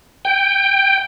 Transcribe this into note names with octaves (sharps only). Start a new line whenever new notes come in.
G5